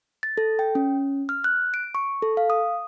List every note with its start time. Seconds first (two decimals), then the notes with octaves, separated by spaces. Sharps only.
0.23 A6
0.37 A4
0.59 G5
0.75 C#4
1.29 F6
1.44 F#6
1.74 D7
1.95 C#6
2.22 A4
2.37 F5
2.50 D#6